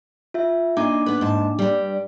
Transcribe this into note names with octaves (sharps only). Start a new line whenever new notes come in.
F4 E5
A#3 D4 D#4 G#5 D6
B3 B4
G#2 A5
G2 G3